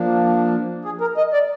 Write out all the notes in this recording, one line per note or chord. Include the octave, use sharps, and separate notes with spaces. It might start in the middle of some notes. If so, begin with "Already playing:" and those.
Already playing: F3 A#3 D4
G#4
A#4
D#5
D5